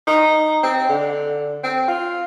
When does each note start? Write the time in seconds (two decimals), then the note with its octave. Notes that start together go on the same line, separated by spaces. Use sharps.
0.07 D#4
0.63 C4
0.89 D3
1.63 C4
1.88 F4